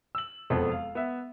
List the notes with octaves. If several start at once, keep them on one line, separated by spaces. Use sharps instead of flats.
E6 F#7
E1 F2 B3 C4 A4
F5
B3 E5